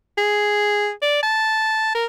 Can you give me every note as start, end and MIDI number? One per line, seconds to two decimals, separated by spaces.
0.18 0.90 68
1.02 1.21 74
1.23 1.91 81
1.95 2.05 70